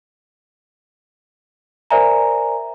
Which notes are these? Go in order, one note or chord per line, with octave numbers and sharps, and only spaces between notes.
A#4 C5 D5 E5 G#5 A#5